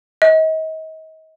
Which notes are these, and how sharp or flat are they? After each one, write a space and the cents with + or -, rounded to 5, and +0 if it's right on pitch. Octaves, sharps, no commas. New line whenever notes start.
D#5 +35